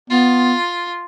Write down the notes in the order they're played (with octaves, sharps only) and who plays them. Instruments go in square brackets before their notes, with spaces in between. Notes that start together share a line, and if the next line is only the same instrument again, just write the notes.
[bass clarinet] B3 [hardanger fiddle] F4